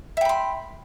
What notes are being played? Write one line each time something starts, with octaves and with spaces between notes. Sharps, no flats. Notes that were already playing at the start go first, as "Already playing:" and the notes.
E5 G5 B5 C6